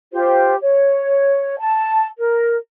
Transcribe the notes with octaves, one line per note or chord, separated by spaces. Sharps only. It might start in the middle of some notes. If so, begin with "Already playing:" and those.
F4 G4 C5
C#5
A5
A#4